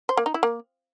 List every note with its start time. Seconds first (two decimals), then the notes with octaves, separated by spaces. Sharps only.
0.09 C5
0.17 A#3
0.26 D#4
0.34 E4
0.43 A#3